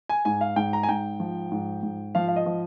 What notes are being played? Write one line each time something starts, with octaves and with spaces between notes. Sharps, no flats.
G#5
G#2 G#5
F5
G#2 G5
A#5
G#5
G#2 G5
F3
G#2
G#2
F3 F5
F5
D#5
F3